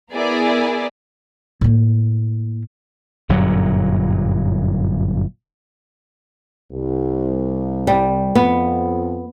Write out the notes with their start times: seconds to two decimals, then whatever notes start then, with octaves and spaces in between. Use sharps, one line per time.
0.11 B3 E4 G#4 A#4 D5 E5
1.61 A2 A#3
3.29 G1 F#2 A#2 F#3
6.72 C2
7.87 G3
8.35 F2 B3